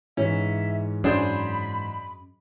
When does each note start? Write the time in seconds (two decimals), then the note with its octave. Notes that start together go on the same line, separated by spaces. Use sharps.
0.17 G#2 E3 C#4 E5
1.04 F#2 D4 G#4 C5 B5